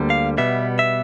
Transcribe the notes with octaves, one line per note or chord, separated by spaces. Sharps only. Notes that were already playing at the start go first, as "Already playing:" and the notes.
Already playing: D2 D3 G3 A#3
F5
B2 G3 B3 E5
E5